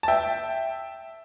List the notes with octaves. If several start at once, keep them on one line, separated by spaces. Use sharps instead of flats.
A5
E5 G5